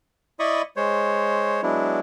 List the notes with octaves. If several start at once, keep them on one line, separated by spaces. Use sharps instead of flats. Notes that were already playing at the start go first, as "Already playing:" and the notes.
E4 D5 D#5 B5 C#6 D#6
G#3 C5 C#5
F#3 G#3 B3 D4 E4